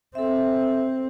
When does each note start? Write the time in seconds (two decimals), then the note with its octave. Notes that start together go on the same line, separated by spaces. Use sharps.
0.15 C4 A4 E5